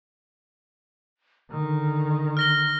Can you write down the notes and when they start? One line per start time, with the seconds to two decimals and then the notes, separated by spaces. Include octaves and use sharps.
1.51 D3 D#3
2.37 F6 A#6 G7